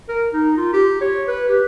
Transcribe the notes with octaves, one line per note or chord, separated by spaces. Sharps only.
A#4
D#4
F4
G4
C#5
B4
G4